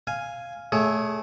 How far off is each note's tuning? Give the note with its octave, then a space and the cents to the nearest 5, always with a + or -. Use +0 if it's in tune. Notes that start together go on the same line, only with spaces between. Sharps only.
F5 -5 G#5 +0
A3 -15 G#4 +0 C#5 +25